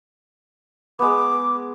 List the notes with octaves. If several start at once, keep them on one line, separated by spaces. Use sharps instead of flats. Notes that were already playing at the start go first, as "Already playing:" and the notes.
G#3 B3 D6